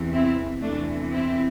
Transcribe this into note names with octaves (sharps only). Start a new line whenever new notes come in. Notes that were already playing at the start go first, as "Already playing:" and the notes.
Already playing: E2 C3 E3
C4 E4
E2 C3 E3 A3 D4
C4 E4